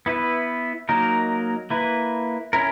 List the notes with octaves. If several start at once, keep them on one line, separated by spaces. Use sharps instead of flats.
B3 E4 B4
F#3 A#3 D#4 A#4
A#3 E4 B4
C#4 E4 A#4